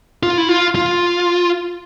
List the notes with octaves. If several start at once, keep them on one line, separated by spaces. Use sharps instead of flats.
F4
E4
F4
F4